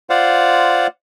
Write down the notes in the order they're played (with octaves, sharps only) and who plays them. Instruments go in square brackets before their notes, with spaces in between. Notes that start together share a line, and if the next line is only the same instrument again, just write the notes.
[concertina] F4 C5 D5 F5 F#5